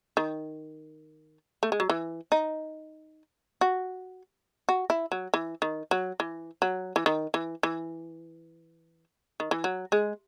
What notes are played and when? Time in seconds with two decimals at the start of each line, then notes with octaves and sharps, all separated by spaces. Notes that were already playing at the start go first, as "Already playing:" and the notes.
0.17 D#3
1.63 A3
1.72 G#3
1.80 F#3
1.90 E3
2.32 D#4
3.61 F#4
4.69 F#4
4.90 E4
5.12 F#3
5.34 E3
5.62 D#3
5.91 F#3
6.20 E3
6.62 F#3
6.96 E3
7.06 D#3
7.34 E3
7.63 E3
9.40 D#3
9.51 E3
9.64 F#3
9.92 G#3